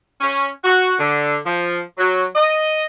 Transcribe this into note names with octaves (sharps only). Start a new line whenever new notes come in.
C#4
F#4
D3
F3
F#3
D#5